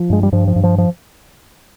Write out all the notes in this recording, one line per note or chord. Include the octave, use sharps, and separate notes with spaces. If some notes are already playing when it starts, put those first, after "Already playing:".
Already playing: F3
G2 G#3
G3
G2 F3
F3
G2
F3
F3